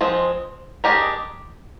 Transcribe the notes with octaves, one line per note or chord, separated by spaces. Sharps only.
F3 G#3 C4
G#3 D4 G4 A#4 D#5